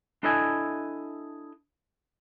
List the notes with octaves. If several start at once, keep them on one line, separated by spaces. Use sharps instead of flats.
D4 E4 A4 D#5 E5 G#5